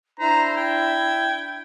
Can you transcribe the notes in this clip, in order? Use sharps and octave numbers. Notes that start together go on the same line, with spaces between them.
D4 E4 C5 A#5
G5 G#6